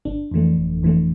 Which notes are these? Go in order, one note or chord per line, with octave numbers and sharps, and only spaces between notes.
G1 D4
F2 E3 A3
G1
F2 E3 A3